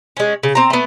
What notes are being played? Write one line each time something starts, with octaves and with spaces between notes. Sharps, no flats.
G#3 C#4
C#3
C4 A#5
A3 B3